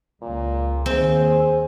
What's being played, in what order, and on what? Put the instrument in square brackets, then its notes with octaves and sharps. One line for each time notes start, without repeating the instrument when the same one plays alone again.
[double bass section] C#2 C#3 [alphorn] A#2
[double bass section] D#2 [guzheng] C4 [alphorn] G#4